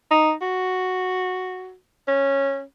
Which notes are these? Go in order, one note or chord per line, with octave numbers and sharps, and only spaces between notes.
D#4
F#4
C#4